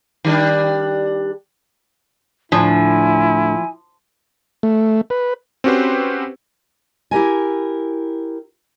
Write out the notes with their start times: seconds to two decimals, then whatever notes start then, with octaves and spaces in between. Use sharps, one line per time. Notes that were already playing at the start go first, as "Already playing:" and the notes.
0.25 D#3 G3 D4
2.52 D2 A2 F3 D4 E4 G#5
4.63 A3
5.10 B4
5.64 C4 C#4 F#4 G4 B4 C5
7.11 E4 G4 A#4 G#5